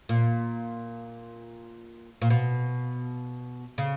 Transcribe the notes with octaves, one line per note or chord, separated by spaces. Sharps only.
A#2
A#2
B2
C#3